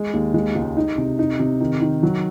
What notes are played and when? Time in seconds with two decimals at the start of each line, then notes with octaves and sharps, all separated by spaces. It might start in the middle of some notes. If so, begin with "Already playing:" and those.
Already playing: G#3
0.13 D#2
0.34 G#3
0.55 C#2
0.77 D#4
0.98 C3
1.19 D#4
1.39 C3
1.60 D#3
1.81 D#3
2.03 F#3